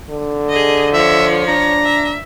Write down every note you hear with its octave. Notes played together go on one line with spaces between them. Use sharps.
D3
G#4 D#5
F3 C#5 E5
D4 A#5
E5